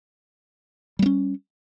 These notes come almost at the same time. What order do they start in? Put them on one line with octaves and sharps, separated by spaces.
G3 A#3 C#4